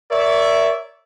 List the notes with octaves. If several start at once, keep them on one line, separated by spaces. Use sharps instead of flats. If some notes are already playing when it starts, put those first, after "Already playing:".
A#4 C#5 D5 E5